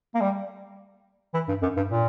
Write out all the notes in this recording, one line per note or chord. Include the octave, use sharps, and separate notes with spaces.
A#3
G3
E3
G2
F#2
G2
A#2